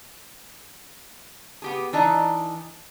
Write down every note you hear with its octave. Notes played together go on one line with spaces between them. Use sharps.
B3 G4 G#4
E3 D4 D#4 A#5